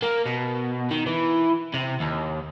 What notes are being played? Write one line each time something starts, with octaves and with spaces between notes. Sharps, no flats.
A#3
B2
D#3
E3
C3
D#2